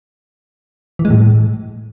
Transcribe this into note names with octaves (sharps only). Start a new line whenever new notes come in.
E3
G#3
A2